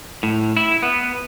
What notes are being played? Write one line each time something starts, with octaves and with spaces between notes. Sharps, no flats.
A2
E4
B3